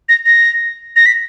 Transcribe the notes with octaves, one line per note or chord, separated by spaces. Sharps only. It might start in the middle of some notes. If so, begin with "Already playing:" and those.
A#6
A#6
A#6
B6